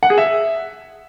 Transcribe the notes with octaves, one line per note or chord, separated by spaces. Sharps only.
F#5
G#4
E5